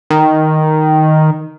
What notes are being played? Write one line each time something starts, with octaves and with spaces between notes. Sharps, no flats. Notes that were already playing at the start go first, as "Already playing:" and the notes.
D#3